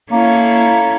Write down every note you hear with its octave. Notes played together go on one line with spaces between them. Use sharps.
A#3 C#4 E4 A4